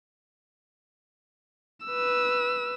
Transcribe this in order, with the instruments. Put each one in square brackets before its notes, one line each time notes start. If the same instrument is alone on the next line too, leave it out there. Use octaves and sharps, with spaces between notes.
[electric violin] B4 E6